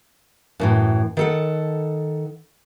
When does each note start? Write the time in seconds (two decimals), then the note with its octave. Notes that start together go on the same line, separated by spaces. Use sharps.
0.60 F#2 A2 E3
1.17 D#3 A4 F#5